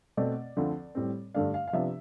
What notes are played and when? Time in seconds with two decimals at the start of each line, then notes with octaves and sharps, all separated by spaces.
0.17 B2 A3 C4 D5
0.57 D2 D3 F3 C4
0.95 A2 G3 C4
1.34 G2 D3 A3 D4 F5
1.54 F5
1.68 F5
1.73 C3 F3 B3 D4 E5